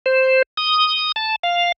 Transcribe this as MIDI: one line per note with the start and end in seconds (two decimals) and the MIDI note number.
0.06 0.42 72
0.57 1.12 87
1.16 1.36 81
1.43 1.72 77